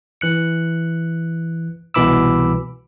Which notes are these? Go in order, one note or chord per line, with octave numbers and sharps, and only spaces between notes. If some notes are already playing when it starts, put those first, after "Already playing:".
E3 F#6 C#7
C2 B2 E3 B5 D6 E6